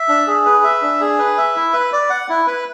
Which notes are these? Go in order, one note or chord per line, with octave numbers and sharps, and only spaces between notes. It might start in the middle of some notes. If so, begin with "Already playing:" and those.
Already playing: E5
D4
G#4
B4
E5
D4
G#4
B4
E5
E4
B4
D5
F#5
E4
B4